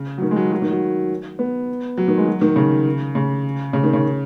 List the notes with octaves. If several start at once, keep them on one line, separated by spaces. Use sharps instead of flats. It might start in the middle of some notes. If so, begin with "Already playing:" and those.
Already playing: C#3
F#3
D#3
G#3
F#3
F#3
D#3
F#3
B3
F#3
D#3
G#3
F#3
D#3
C#3
C#3
C#3
D#3
C#3